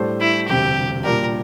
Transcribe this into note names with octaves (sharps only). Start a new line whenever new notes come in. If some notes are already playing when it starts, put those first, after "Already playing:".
Already playing: A2 G3 D4 A4 C5
E4
E1 D2 C3 G3 G4
A#2 G3 D4 G4 A#4